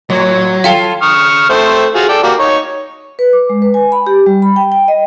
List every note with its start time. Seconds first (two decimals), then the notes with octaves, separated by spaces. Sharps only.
0.10 A2 F#3 C#5
0.64 F4 A4 F5 G5 A5
1.02 C#6 D#6 F6
1.50 A3 C4 C5
1.95 F4 F#4 G#4
2.09 A4 D5 G5
2.23 A#3 F#4 G4
2.39 D#4 C#5
3.19 B4
3.33 D6
3.50 G#3
3.62 B4
3.74 G#5
3.92 B5
4.07 G4
4.26 G3
4.42 B5
4.56 G5
4.72 G5
4.88 D#5